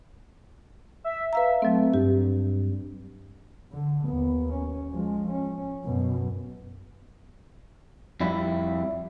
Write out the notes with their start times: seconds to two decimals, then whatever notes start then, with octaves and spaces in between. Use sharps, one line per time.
1.04 E5
1.33 B4 E5 F5 A#5
1.62 F#3 A3 C4
1.94 G2 G4
3.73 D3
4.08 D#2 B3
4.52 C#4
4.91 F3 G#3
5.30 C#4
5.84 F#2 B2
8.20 F2 G3 E4